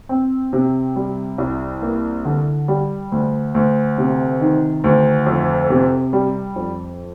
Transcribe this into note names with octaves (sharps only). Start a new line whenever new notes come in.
C4
C3
G3
C2
A#3
D3
G3
D2
D2
C3
D#3
D2
F2
C3
G3
F2